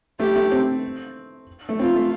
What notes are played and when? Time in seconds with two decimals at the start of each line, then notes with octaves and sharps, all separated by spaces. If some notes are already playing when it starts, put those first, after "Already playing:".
0.20 A3 G4
0.36 A3
0.52 C4
1.69 A3
1.79 C4 F4
1.94 A3